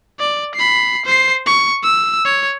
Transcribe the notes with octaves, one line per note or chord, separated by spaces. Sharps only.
D5
B5 C7
C5 C7
C#6
E6
C#5